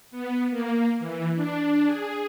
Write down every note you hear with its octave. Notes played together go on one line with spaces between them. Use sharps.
B3
A#3
E3
D4
G#4